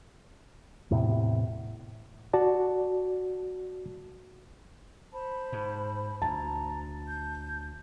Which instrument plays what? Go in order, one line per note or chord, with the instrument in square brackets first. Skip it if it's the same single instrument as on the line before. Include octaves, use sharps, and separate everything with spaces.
[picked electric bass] E2 A2 C3
[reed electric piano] F#4 D5 A5
[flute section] C5 A5 B5
[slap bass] G#2
[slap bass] D2 [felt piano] A5 [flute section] A#5
[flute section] G6